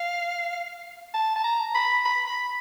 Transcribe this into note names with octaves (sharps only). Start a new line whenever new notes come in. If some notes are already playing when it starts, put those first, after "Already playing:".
Already playing: F5
A5
A5
A#5
B5
B5
B5